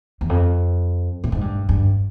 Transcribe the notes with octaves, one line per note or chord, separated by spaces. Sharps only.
E2
F2
A2
G#2
G2
G2